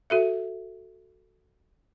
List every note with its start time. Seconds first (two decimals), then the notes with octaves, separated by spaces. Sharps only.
0.10 F#4 A4 E5